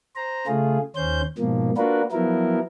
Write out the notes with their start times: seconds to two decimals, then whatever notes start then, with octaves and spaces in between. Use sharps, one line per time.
0.16 C5 A#5
0.47 C#3 A3 F4 G#4
0.96 D#2 C#4 C5 G6
1.38 G#2 B2 F3 A#3
1.77 A#3 D4 F4 F#4 A#4 B4
2.12 F3 F#3 B3 E4 A#4